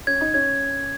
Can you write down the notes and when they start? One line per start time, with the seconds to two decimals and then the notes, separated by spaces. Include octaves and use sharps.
0.07 C#4 G#6
0.21 D#4
0.34 C#4 G#6